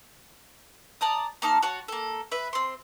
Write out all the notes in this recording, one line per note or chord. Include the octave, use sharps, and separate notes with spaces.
D5 A5 A#5 D#6
A#3 D#4 A5 F6
F#4 C#5 A5
A#3 A4
B4 E5
C4 C6